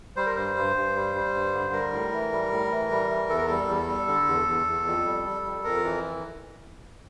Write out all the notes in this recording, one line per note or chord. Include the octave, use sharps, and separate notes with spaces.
G3 C5
A#4
G2 C5
G2
G2
G3
G3
G2
D3
G3 A#4
A2
E3
G3
A2
E3
G3
E3
E2 A4
A#4
G3 A4
E2
G3
D3
E2
E2
E2
F2
G3
G3
F2
F2 A#4
E3